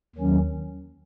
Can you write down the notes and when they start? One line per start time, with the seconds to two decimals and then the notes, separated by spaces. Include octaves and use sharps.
0.16 D#2 D#3 F#3 C#4